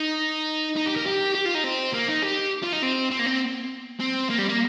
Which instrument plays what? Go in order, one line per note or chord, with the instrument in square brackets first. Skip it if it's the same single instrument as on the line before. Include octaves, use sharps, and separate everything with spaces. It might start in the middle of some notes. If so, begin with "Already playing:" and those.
Already playing: [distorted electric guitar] D#4
D#4
G4
A#4
G4
G4
F4
D#4
C4
A#3
D#4
G4
F4
D#4
C4
C4
A#3
C4
C4
A#3
G3
A#3